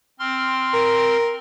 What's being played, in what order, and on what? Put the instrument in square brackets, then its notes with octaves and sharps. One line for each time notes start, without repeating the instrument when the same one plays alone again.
[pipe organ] C4 C6 F6
[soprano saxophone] A#4